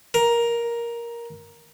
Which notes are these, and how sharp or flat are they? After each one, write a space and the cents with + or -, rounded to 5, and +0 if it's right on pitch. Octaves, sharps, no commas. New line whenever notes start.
A#4 +10